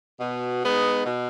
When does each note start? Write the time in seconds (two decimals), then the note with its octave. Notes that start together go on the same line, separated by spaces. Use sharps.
0.20 B2
0.63 G#3 B3 D#4
1.05 B2